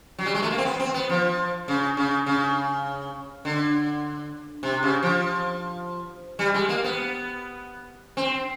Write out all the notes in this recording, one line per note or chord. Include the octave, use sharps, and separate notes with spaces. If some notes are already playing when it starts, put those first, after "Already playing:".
F#3
G3
G#3
A3
A#3
C4
B3
C4
B3
F3
C#3
C#3
C#3
D3
C3
C#3
F3
G3
G#3
A#3
B3
C4